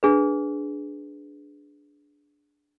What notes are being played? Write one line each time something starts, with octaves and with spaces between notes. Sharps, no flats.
D4 G#4 B4